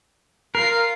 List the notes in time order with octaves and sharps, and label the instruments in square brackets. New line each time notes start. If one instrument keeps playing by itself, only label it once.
[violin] F4 C7 [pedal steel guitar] A#4